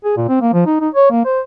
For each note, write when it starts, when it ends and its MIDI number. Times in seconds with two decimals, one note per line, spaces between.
0.05 0.14 68
0.17 0.24 46
0.28 0.37 60
0.41 0.51 58
0.53 0.62 53
0.66 0.79 63
0.81 0.89 63
0.94 1.08 73
1.10 1.24 58
1.25 1.40 72